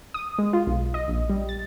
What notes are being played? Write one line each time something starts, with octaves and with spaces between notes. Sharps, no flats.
D#6
G#3
F4
B1
D#5
A#1
G3
A6